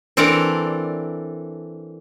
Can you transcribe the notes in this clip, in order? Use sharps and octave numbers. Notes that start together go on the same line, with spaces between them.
E3 C4 D4 A4 A#4 D5